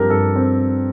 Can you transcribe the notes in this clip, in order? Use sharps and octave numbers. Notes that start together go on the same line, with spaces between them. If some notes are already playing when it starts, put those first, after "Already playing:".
Already playing: G2 F3 C4 G4 A4 A#4
G2 A4
C4